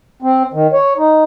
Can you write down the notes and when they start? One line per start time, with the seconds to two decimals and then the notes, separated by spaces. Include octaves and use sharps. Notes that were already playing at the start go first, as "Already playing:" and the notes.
0.22 C4
0.53 D#3
0.73 C#5
0.97 D#4